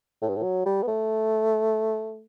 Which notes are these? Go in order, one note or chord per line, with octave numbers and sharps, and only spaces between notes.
A2
G2
A2
F#3
G3
B3
A3